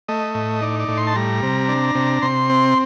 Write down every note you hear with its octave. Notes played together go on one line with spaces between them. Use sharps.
A3 D#5
A2
D#4 D5
D5
A2
C6
A5
G3 A#5
C3
D4
C3
C3 C6
C4